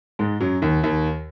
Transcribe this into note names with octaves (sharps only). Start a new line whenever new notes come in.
G#2 G#3
F#2 F#3
D#2 D#3
D#2 D#3